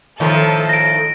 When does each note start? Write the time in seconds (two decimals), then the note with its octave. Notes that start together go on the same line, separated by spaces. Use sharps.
0.20 A2 D#3 F3 A4
0.69 A#6 D7